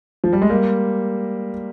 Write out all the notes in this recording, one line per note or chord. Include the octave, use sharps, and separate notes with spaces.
F3
G3
G#3
G3 A#3